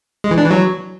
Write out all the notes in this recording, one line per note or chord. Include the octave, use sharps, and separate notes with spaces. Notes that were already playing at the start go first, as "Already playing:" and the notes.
G#3
E3
D4
E3
F#3